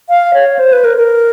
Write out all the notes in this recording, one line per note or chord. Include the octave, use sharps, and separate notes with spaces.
F5
C#5
C5
B4
A#4
A#4